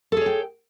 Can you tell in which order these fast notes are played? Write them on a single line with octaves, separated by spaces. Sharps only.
A4 G#4 C#5 G5